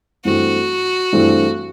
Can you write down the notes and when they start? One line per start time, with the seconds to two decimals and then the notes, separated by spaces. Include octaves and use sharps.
0.25 G2 E3 A3 C4 F#4
1.13 G2 E3 A3 C4